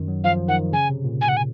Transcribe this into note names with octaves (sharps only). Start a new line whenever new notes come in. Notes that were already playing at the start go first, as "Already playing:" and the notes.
Already playing: F#2 D#3
F#3
F3 F5
D#3 F#5
C#3 G#5
C3
A#2
G#5
F#5
G#5